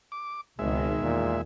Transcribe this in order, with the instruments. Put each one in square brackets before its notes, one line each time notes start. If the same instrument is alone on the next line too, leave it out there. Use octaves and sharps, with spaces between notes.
[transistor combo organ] D6
[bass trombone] G#1 [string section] C#2 B2 D#3 [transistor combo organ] G#3 E5
[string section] E2 [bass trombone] A#2